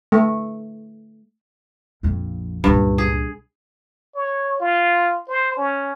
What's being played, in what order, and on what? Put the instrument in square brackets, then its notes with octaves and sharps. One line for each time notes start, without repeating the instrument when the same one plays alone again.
[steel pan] A3
[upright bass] A#1 F2
[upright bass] C#2 A#2 [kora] G2
[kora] G#4
[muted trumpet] C#5
F4
C5
C#4